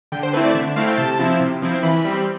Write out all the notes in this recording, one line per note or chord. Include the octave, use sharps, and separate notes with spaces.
D3 G5
C5
A3 C4 E4 B4
D5
D3 E5
A3 C4 E4 F5
G5
C3 A5
F3 C4 E4
C3
F3 C4 E4
E3 B5
G3 C4